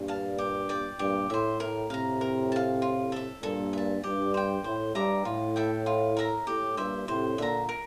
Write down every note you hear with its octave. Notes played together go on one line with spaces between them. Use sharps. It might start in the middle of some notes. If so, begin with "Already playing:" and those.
Already playing: G2 A#2
F5 A5
G4
D5 G5
G2 A#2 G4
A2 C5 E5
A2 A#4
A2 C3 F5 A#5
A#4
F5 A5
F4
A4 E5
G2 A#2 A4
E5 A5
G2 G4
C5 G5
A2 C5
G2 E5 A#5 D6
A2 F4
A4 E5 G5
F4
A#4 E5 A#5
A2 G4
G2 A#2 C5 E5
A2 C3 C5
A#2 D3 E5 A#5
A#4